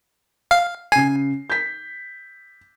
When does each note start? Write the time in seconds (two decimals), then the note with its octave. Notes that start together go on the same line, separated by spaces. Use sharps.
0.51 F5
0.92 C#3 G#5 C7
1.50 G6 B6